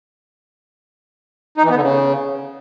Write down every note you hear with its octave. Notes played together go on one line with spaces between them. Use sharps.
D#4
E3
B3
D3
C#3